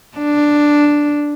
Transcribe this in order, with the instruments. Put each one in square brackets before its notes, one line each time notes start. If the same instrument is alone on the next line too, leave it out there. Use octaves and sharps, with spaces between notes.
[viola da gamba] D4